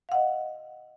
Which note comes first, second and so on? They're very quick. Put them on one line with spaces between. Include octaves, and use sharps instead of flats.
F5 F#5 D#5